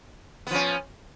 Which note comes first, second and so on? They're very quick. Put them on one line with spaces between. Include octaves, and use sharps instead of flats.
B3 F3 C#4